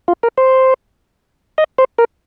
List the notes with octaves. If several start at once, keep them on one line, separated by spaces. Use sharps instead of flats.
F4
A#4
C5
D#5
C5
A#4